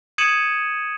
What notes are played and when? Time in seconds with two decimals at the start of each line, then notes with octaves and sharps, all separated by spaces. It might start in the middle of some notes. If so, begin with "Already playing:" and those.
0.18 D#6 G#6 C#7 D#7 E7 F#7